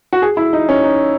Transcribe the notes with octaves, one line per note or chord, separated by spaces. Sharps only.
F#4
G#4
E4
D#4
C#4
D#4